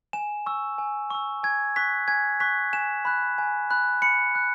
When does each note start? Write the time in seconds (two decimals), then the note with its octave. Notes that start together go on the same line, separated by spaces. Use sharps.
0.13 G#5 E7
0.46 C#6 E6
0.78 G#5
1.10 C#6 E6
1.43 G#5 G#6
1.76 C#6 F#6 B6
2.08 G#5 G#6
2.40 C#6 F#6 B6
2.73 G#5 E7
3.05 B5 F#6
3.38 G#5
3.71 B5 F#6
4.02 B5 C#7
4.35 F#6